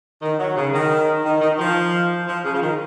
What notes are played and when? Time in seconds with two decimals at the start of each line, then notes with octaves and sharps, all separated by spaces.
0.22 D#3
0.39 F#3
0.56 C#3
0.73 D#3
1.24 D#3
1.41 D#3
1.53 D#3
1.58 F3
2.27 F3
2.44 C#3
2.53 F3
2.61 D#3